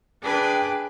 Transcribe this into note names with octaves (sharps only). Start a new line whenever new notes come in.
D4 G#4 B4 G5 F#6